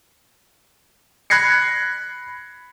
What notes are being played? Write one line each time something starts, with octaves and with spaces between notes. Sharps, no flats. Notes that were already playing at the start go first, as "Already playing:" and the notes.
B5 F#6 G#6 A#6 C7 C#7